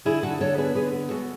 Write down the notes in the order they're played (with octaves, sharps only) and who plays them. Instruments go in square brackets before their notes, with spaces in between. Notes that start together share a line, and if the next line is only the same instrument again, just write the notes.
[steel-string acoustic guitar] D3 E4 G#4
D3 F#4 A4
D3 A4 C#5
B3 G#4 B4
D3 G#4 B4
B3
G#3 F#4 A4